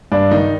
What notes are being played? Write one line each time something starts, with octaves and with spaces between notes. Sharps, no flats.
G2 D4
D#3 D#4